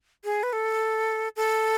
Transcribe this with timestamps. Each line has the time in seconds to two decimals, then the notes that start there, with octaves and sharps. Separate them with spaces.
0.24 G#4
0.43 B4
0.53 A4
1.36 A4